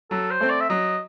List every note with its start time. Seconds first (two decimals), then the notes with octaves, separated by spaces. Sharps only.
0.11 F#3 A4
0.31 C5
0.40 A3 C4
0.50 D5
0.60 E5
0.70 F#3 D#5